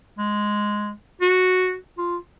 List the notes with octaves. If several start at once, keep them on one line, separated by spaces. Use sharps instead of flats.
G#3
F#4
F4